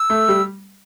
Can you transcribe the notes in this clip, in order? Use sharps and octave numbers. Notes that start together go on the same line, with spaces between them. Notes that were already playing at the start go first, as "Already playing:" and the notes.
Already playing: E6
A3
G3